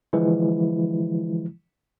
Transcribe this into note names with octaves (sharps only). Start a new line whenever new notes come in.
D3 E3 F3 G#3 E4